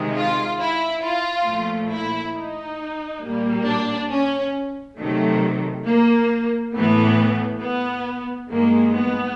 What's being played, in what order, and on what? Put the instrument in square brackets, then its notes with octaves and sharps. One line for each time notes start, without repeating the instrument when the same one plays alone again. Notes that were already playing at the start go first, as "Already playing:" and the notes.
Already playing: [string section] C3 D#3 G#3
F4
E4
F4
A#2 F3 A3
E4
D#4
A#2 G3 A#3
D4
C#4
C3 D#3 F#3 A3
A#3
A2 E3 A3 B3
B3
G2 D#3 G#3 A#3
B3